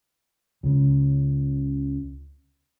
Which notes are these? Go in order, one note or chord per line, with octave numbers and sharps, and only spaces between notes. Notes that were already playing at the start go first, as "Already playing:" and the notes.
C#2 C#3